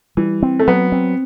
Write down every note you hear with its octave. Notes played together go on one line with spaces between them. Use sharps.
E3 G3
C4
A3
F#3 B3
C4